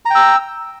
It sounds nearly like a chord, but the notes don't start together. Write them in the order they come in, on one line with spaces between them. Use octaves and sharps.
A#5 G5 E6